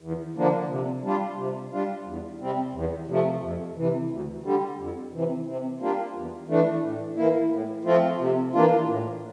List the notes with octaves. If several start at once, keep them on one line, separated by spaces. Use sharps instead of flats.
E2
D3 F3 A#3 D4
C3
G3 D4 F4
C3
G3 D4 F4
E2
C3 G3 C4
E2
C3 F3 A3
F2
C3 E3
D2
D3 G3
F2
C3 E3
C3
G3 A#3 D4 F4
E2
E3 A3 D4
A2
E3 A#3 E4
A2
F3 A3 C4 F4
C3
E3 A#3 D4 F4
A2